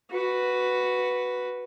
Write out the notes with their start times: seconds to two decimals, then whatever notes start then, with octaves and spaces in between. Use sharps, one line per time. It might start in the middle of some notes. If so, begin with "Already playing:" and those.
0.11 F#4 B4